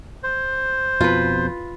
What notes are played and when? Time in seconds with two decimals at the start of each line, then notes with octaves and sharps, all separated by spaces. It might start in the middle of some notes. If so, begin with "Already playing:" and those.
0.23 C5
1.01 F2 B2 F4 B4